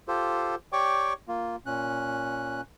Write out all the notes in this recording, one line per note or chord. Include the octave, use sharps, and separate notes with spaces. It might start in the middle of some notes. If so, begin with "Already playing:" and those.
F4 G4 A4 C5
G4 C#5 D5 G5 C#6 D6
A#3 F4
A#2 C#4 F#6